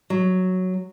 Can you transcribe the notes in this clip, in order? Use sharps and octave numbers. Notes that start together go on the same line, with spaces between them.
F#3